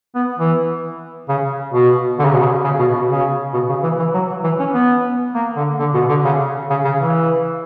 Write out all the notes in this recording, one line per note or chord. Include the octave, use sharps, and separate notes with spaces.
B3
E3
C#3
B2
D3
C#3
B2
C#3
C#3
B2
B2
C#3
B2
C#3
E3
E3
F#3
E3
C#4
B3
A#3
D3
D3
B2
D3
C#3
C#3
C#3
E3